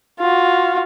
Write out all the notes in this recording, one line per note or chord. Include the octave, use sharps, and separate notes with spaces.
F4 F#4